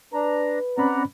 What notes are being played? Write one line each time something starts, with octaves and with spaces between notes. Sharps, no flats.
D4 B4 A#5
C4 C#4 D5 F#5 A#5 B5